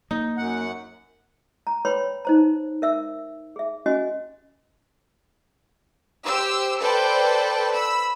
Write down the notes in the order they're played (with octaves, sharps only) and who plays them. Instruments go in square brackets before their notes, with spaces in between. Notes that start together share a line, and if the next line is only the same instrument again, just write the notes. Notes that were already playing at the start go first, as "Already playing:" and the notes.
[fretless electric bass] A#3 [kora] D#4
[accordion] F#2 F#5
[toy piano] A#5
B4 C#5 G5 B5 C6
D#4 C5 A#5
A#4 E5 E6
G#4 E5
C#4 F#4 D#5 G#5
[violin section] G4 C5 E6
A4 B4 C5 D5 G5 A5
B5 E6